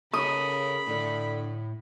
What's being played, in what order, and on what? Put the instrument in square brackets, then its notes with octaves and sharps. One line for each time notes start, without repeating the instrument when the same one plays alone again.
[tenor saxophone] C#3 [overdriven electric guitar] A4 A#4 [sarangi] B5 [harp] D#6
[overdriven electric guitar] A2 [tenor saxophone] D3